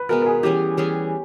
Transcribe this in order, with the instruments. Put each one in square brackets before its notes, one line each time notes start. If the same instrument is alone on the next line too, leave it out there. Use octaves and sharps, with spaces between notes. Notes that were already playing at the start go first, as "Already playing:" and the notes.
Already playing: [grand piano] B4
[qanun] B2 G#3 B3 [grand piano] A#4
[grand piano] A#4
G#4
[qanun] E3 G3 C#4 G#4 [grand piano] G4
[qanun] E3 G3 C#4 G#4